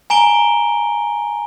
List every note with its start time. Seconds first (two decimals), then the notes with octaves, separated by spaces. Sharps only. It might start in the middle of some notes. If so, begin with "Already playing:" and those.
0.10 G#5 A#5 D7 G7